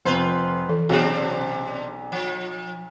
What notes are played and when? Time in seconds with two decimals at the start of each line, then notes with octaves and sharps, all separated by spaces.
0.05 F1 F2 F4 B4 C5
0.69 E3 A4
0.89 B1 C3 C4 D4 F#4 G#4
2.12 F3